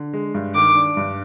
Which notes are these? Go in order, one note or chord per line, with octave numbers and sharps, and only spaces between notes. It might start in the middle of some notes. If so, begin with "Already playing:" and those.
Already playing: D3
G#3
G2
D#3 D6
D4
G2